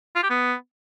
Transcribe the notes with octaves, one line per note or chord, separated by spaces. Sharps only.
F4
G4
B3